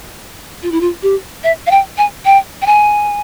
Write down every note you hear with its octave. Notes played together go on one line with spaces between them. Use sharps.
F4
E4
F4
G4
E5
F5
G5
G#5
G5
G5
G#5